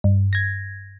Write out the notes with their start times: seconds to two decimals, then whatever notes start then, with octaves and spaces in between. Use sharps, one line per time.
0.04 G2
0.33 G#6 A#6